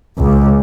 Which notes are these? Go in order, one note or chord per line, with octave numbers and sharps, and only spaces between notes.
C#2